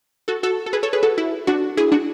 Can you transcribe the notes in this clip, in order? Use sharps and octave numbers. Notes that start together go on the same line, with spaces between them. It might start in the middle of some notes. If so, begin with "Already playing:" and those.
F#4 A4
F#4 A4
A4
G#4 B4
A4 C#5
G#4 B4
F#4 A4
E4
D4 F#4
E4 G#4
D4 F#4